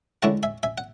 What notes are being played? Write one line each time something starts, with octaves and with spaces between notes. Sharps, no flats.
D3 G#3 C#4 E4 F#5 A5
E5 G#5
E5 G#5
F#5